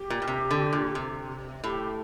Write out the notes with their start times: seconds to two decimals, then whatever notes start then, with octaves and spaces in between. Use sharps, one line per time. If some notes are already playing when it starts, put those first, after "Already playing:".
Already playing: G4
0.10 A#2
0.22 A#2
0.28 C3
0.51 D3
0.73 A#2
0.95 C3
1.64 A2 G4